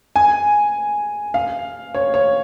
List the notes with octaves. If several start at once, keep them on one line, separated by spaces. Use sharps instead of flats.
G#5
F5
C#5
C#5